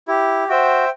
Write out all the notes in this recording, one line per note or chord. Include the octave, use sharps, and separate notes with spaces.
E4 G4
F#4 C5 E5 G5